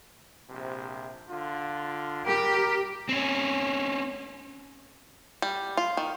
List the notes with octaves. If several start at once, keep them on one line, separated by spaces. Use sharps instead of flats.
A#1 C3
D3 F4
G3 G4 A#4
C4 C#4
G3
F4
D#3